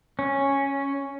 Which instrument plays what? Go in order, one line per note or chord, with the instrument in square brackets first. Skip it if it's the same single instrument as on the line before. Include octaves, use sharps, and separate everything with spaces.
[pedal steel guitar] C#4